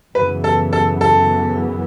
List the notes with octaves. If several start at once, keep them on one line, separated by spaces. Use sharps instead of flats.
F#2 C#3 E3 B3 B4
A4
A4
A4